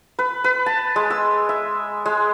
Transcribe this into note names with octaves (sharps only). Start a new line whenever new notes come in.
B4
B4
A5
G#3
E6
E5
G#3